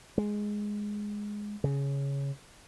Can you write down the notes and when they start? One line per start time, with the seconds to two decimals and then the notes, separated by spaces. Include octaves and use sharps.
0.18 G#3
1.64 C#3